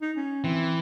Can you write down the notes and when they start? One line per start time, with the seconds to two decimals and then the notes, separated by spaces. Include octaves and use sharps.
0.02 D#4
0.17 C#4
0.44 E3 C4